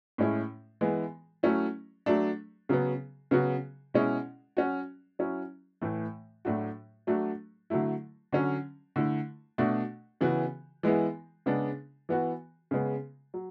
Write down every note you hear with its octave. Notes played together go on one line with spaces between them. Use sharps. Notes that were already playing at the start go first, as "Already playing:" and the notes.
A2 G#3 C#4 E4
E3 G#3 B3
F#3 A3 C#4 E4
F#3 A3 D4
C#3 F#3 B3
C#3 F#3 B3 F#4
B2 G#3 C#4 E4
F#3 C#4 F#4
F#3 C#4 E4
A2 E3 A3
A2 F#3 A3 D4 F#4
F#3 A3 D4 F#4
D3 F#3 A3 E4
D3 F#3 C#4
D3 A3 E4
B2 A3 D4 F#4
C#3 E3 B3 F#4
E3 G#3 B3 E4
C#3 G#3 B3 D4
E3 B3 F#4
C#3 G#3 B3
F#3